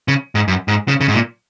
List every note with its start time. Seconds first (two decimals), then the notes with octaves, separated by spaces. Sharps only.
0.08 C#3
0.35 G#2
0.48 F#2
0.68 G#2
0.88 C#3
1.01 C#3
1.08 G#2
1.14 A#2